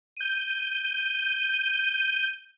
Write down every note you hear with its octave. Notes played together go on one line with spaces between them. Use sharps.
G6 D#7